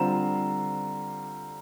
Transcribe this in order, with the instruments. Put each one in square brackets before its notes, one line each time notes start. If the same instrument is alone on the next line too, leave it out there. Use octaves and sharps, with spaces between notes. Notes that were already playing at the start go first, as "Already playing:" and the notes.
Already playing: [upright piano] D3 G3 C4 F4 [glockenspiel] A#5